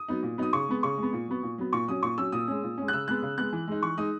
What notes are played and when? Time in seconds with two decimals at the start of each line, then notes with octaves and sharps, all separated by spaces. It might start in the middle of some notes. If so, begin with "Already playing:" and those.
Already playing: D#6
0.09 F#3 B3 D#4
0.23 A#2
0.38 F#3 B3 D#4 D#6
0.53 C#3 C#6
0.68 G#3 B3
0.83 C#3 C#6
0.98 G#3
1.03 B3
1.13 A#2
1.28 F#3 B3
1.43 A#2
1.58 F#3 B3
1.73 A#2 C#6
1.88 F#3 C#4 D#6
2.03 A#2 C#6
2.18 F#3 C#4 E6
2.32 A#2 D#6
2.48 G#3 C#4
2.63 A#2
2.78 G#3 C#4
2.88 F#6
2.93 C#3 E6
3.08 G#3 B3 F#6
3.22 C#3
3.38 G#3 B3 F#6
3.53 E3
3.68 G#3 D#4
3.83 E3 C#6
3.97 G#3 D#4 D#6